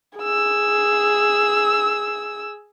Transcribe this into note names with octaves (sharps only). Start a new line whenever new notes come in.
G#4 E6